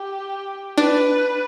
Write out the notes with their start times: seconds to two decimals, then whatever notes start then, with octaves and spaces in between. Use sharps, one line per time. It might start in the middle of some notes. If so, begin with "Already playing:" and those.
Already playing: G4
0.78 D4 B4